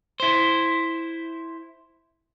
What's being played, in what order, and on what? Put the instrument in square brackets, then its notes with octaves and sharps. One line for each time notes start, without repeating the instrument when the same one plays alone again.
[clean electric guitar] E4 C5